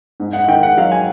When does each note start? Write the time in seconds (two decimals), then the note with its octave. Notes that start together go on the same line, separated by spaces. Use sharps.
0.20 G#2
0.33 F#5
0.44 F#5
0.48 D#3 G5
0.63 F#5
0.77 F#3 F5
0.92 G#5